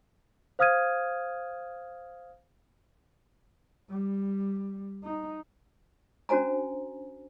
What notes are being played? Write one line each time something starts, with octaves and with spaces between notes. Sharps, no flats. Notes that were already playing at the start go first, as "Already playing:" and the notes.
C5 F5 D#6 F6 G#6 D#7
G3
D#4
C#4 D4 F#4 C5 G#5 A#5